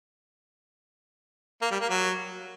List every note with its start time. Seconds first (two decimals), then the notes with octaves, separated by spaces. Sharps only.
1.62 A#3
1.71 G3
1.80 A#3
1.90 F#3